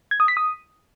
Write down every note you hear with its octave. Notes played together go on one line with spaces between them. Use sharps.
G#6
D#6
B6
D#6